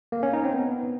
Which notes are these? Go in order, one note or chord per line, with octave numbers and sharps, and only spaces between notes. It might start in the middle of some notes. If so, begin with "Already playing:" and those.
A#3
C#4
D#4
C4
B3